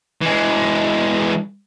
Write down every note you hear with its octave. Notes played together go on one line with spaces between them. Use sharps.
E3 G#3